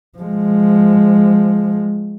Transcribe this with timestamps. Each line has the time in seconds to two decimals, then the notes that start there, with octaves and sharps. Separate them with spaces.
0.18 F3 G#3